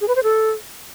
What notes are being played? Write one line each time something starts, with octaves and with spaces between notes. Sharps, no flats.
G#4
B4
C5
A4